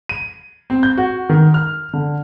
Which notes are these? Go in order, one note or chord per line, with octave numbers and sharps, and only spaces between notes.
D#7
C4
G6
F#4
D#3
F6
D3